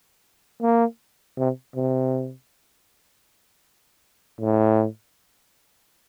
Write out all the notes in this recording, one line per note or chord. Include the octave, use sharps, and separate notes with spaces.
A#3
C3
C3
A2